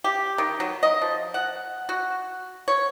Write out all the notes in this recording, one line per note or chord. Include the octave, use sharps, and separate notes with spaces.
G4
D#3
F#3
D#5
F3
F#5
F#4
C#5